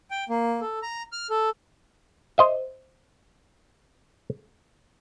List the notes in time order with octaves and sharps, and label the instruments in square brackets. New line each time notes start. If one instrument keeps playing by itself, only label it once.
[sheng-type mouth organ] G5
A#3
A4
A#5
F6
A4
[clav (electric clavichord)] C5 D#5 E5